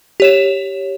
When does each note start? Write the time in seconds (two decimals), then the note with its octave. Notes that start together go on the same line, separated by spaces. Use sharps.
0.20 G4 C#5 E7